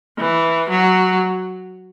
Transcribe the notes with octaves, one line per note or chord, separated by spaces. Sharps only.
E3
F#3